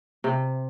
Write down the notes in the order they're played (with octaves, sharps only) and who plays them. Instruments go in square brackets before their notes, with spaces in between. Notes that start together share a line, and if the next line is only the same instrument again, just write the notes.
[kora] C3